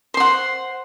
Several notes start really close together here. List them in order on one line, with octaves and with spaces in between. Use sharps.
C5 C6 F#5